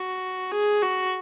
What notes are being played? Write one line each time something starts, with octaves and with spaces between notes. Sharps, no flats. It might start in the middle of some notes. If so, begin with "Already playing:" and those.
Already playing: F#4
G#4
F#4